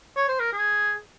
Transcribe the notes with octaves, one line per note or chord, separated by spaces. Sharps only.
C#5
C5
A#4
G#4